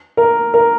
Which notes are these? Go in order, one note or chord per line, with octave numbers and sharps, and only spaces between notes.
A#4
A#4